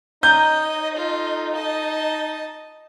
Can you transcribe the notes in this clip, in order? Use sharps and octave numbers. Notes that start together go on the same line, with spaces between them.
D#4 C#5 D#5 A#5 G6
F4 A4
D#5 A5